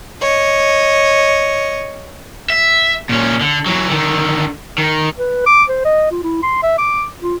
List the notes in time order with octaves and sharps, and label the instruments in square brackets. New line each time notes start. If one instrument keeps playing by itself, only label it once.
[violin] C#5 D#5
[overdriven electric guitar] E5
A#2 C#4
D3
E3 F#3
D3 D#3
D#3
[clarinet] B4
D6
C5
D#5
F4
E4
C6
E5
D6
F4